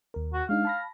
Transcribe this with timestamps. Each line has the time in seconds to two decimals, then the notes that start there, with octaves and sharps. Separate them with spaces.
0.14 D#2 A#4
0.33 F#4
0.49 G#3 D4 D#4 F5
0.65 A5 B5 A#6